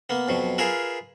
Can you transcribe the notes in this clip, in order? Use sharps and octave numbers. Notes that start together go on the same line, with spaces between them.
A#3 B3
F2 B2 F#3
F4 G#4 A#4 B4 E5